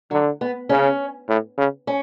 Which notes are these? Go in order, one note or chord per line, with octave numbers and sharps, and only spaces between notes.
D3 F#3
B3
C#3 C#4
A2
C#3
C#4